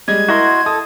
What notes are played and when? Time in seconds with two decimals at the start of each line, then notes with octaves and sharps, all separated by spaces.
0.08 G3 G#3 D#5 G#6
0.29 E4 F#4 A#4 D#5 C6
0.66 A4 D#6